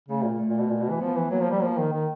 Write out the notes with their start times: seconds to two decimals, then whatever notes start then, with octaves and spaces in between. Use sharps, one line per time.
0.08 C#3 A3
0.24 A#2
0.39 A3
0.49 A#2
0.59 B2
0.70 A#2
0.80 B2
0.90 E3
1.00 F3 B3
1.16 E3
1.31 F#3 A#3
1.41 F3
1.51 G3
1.61 F3 A#3
1.78 D#3
1.93 D#3